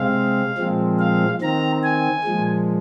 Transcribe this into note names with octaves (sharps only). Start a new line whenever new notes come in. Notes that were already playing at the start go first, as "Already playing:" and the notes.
Already playing: C3 G#3 C4 F5
A#2 F3 G#3 C4
F5
D#3 C4 A#5
G#5
A#2 F3 G#3